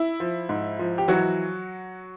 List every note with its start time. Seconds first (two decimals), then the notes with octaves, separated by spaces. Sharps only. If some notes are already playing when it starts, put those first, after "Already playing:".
Already playing: E4
0.20 F3
0.49 G#2
0.79 F3
0.98 G4
1.08 E3 F#3 F#4